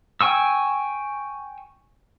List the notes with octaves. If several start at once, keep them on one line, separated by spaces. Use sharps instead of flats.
G5 G#5 C#6 E6